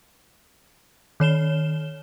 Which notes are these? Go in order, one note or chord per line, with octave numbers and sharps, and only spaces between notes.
D#3 C#5 E7 G7